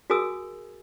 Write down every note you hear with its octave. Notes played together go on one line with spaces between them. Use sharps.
F#4 G#4 A#4 G#5 D#6 E6